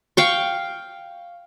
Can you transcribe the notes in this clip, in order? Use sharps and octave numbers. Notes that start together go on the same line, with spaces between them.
F5 G5 C#6